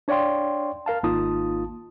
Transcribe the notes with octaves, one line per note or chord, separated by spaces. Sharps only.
D4 C#5 D5 F5 G5 C6
A#4 F5 A5
G#1 A#3 D#4 F4 A5 D#6